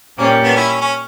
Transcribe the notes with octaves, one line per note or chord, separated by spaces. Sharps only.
A#2 G3 A#3 C#4 G4
B3 D4
C#4 E4
C#4
C#4